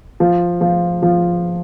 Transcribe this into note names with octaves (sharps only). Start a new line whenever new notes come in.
F3
F3
F3